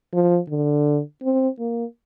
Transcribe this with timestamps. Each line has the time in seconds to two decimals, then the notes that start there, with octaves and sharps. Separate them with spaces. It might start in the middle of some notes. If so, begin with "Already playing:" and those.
0.13 F3
0.50 D3
1.23 C4
1.59 A#3